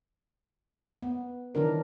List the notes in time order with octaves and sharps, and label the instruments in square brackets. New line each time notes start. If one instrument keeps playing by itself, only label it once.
[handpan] B3
D#3 E3 F#3 D4 A#4